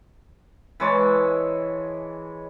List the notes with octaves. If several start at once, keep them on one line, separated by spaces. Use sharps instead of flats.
E3 G#3 C#5 A5